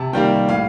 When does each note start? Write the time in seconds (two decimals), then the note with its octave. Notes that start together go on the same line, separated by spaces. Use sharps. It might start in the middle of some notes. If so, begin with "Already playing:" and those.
Already playing: C3 A5
0.13 D#3 G3 A#3 G5
0.49 A2 F5